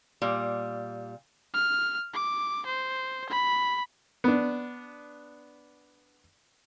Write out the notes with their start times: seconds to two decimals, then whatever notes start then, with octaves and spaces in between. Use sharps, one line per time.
0.22 A#2 G3
1.54 F6
2.13 D6
2.66 C5
3.29 B5
4.24 B3 D4